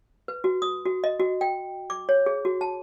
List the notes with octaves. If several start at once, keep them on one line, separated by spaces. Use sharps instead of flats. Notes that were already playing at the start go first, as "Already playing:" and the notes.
B4
F#4
D#6
F#4
D#5
F#4
G5
D6
C#5
G#4
F#4
A5